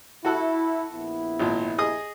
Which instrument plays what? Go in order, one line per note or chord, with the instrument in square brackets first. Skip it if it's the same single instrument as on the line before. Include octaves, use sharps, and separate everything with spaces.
[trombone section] E4 [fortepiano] F#4 A4 F#5
[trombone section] A#1 B3 E4
[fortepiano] G#1 A#2
G#4 D#5 D#6